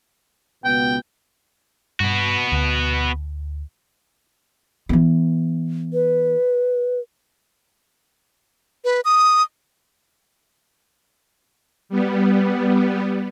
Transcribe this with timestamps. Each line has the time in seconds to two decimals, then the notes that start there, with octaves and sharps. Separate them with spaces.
0.64 C#2 B2 B3 G5
2.00 G2 B3 F#4
2.52 D2
4.89 E3 B3
5.93 B4
8.85 B4
9.05 D#6
11.89 G3 B3